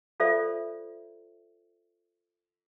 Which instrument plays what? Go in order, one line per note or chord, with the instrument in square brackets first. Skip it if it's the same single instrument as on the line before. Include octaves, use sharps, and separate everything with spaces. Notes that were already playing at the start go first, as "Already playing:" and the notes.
[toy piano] F4 A4 C5 D5 E5